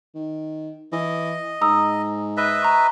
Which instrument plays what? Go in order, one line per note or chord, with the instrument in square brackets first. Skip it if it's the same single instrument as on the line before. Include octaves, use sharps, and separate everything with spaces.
[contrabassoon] D#3
[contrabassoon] E3 [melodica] D#5
[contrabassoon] G#2 [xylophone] A#5 D#6 E6
[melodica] B4 D#5 E5
[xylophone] A#5 C#6